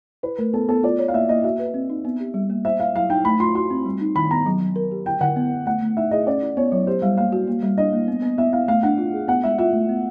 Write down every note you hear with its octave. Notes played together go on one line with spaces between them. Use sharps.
E4 B4
A3 A#4
B3 A4
B3 A4
F4 D5
C#5
F5
A#3 E5
A#3 D#5
F#4 E5
B4
C4
D#4
B3
G4
G3
A#3
C5 E5
E4 F5
F#3 F5
D#4 G5
A3 B5
F4 C6
F#4 C6
C4
G3
D#4
D#3 B5
B3 A#5
F#3
F#3
A#4
G4
D3 G5
D3 F#5
B3
B3
A3 F#5
A3
D#4 E5
G#4 D#5
C#4 D5
E4
B3 C#5
F#3 C#5
G4 C5
G3 F5
A#3 F5
F#4
A#3
G3
D4 D#5
A#3
B3
B3
B3 E5
B3 F5
A3 F5
D4 F#5
F4
G#4
B3 F#5
G#3 E5
F4 E5
A3
B3